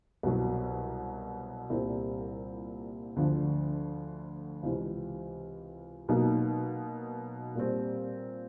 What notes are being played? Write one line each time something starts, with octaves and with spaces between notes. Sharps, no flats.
C2 B2 F#3
C2 A#2 G3 C4 E4
D2 D3 F3
C#2 C3 E3
B2 F#3 A#3 D#4
A#2 G3 C4